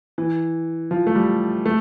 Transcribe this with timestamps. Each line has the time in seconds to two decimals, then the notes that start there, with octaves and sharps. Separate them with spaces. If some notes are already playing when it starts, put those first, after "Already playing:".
0.18 E3
0.91 F3
1.07 A3
1.15 G3
1.66 A3